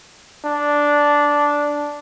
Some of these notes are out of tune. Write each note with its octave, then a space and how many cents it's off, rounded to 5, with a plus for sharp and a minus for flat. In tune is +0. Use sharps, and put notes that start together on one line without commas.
D4 -5